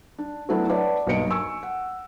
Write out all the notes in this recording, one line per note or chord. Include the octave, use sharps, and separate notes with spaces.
D4
F#3 A3 B3 D4 E4
B4 C#5 D5 E5 F#5 A5
B1 G2 A#3 D#5 C#7 D7
G#5 C#6 E6
F#5